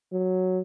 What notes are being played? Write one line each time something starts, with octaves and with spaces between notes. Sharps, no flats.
F#3